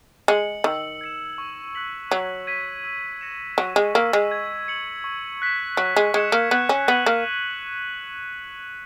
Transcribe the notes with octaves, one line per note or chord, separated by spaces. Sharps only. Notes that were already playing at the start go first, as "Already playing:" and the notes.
G#3 C#7 F#7
D#3 E6
G#6 C#7 E7
C#6
F#6 B6 F#7
F#3 E6
G#6 B6 D#7
E6
A#6 C#7 E7
F#3 C#6
G#3
A#3 E6 B6
G#3
G#6
C#7 F#7
C#6
F#6 B6 E7
F#3 C#6
G#3
G#3 G#6 C#7 E7
A#3
B3 F#6
C#4
B3 B6 D#7 F#7
A#3